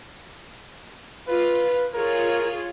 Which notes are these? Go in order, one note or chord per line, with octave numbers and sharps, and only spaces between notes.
F4 B4
F4 G#4 A#4 C#5